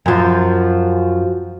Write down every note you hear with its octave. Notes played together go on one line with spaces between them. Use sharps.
F#2 F3